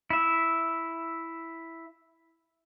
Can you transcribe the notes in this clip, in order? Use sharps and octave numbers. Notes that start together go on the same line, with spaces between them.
E4 E5